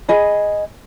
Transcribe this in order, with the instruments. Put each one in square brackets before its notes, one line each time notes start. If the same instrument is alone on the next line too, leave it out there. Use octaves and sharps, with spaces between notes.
[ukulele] G#4 D#5 B5